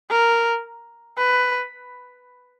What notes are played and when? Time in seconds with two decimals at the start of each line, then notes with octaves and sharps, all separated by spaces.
0.11 A#4
1.18 B4